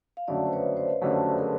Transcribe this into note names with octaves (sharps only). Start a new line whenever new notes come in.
F5
F#1 F2 D3 F#3 A3 D5 E5
C5
B4 C#5
C5 D5
F#1 F2 D3 F#3 A3 G4 A4
G#4 A#4